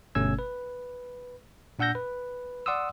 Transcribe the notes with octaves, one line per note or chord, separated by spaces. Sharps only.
G1 B2 A3 C#4 E6 G#6
B4
A#2 D4 F#5 E6 G6 A#6
B4
D5 F#5 C6 D#6 E6